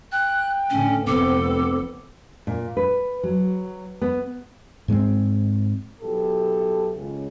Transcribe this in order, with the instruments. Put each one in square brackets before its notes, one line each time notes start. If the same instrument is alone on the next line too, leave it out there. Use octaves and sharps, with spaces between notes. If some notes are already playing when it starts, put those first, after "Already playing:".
[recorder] G5 [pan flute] F#6
[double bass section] A2 D3 [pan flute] C#4
[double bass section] F1 B3 C4 [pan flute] A4 [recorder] D6
[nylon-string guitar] A#2
B4
F#3
B3
[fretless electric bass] G#2 G#3 A#3 C4
[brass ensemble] B1 F#3 B3 E4 G4 A4
C#2 C#3